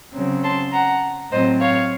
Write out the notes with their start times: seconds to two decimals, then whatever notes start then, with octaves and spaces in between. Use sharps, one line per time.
0.13 C#3 F#3 C4
0.43 A5 C6
0.71 F#5 A#5
1.31 A2 F#3 C4 C5 D#5
1.60 C#5 F5